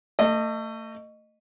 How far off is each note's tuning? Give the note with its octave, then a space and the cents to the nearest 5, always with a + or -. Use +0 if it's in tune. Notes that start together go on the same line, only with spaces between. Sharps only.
A3 +30 D#5 -15